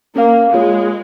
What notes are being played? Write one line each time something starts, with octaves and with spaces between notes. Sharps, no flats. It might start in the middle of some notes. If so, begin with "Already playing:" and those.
A#3 C#4 A#4 F5
G#3 A#3 F4 C#5